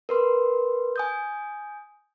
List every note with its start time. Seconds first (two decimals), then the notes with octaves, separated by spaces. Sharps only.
0.09 A#4 B4 C6
0.96 G#5 D#6 G6